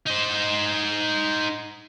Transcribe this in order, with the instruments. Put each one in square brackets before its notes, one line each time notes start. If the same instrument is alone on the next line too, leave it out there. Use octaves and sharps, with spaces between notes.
[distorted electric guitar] D#4 C5